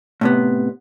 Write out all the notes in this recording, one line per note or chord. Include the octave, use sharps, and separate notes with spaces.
A2 C3 B3